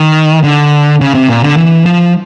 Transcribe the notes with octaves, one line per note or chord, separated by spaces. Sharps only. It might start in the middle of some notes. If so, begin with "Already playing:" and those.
Already playing: D#3
D3
C#3
C3
A#2
D3
E3
F3